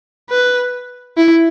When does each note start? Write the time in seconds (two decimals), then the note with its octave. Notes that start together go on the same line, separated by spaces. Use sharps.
0.30 B4
1.17 E4